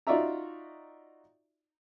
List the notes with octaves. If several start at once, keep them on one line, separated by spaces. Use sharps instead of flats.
D#4 F4 F#4 D5 E5 A#5